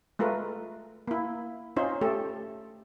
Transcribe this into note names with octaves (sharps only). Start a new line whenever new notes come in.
G#3 A3 F4 A#4 B4
A#3 E4
C#4 D#4 F4 C5
A3 G4 A4